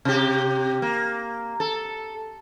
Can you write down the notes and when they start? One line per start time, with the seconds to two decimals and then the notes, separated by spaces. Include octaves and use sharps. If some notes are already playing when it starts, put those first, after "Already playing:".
0.05 C3 G4
0.82 A#3
1.60 A4